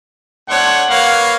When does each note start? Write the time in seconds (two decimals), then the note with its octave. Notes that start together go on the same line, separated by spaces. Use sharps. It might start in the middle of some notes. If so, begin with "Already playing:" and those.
0.50 A3 D4 C5 C#5 F#5
0.90 A#3 B4 C#5 F5